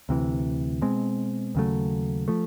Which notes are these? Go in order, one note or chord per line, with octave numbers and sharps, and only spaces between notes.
D2 C3 E3
B2 G#3 C4
D#2 C#3 F#3 A3
F3 A3